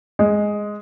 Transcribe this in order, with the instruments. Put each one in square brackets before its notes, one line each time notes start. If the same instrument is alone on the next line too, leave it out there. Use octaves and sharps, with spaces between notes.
[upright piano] G#3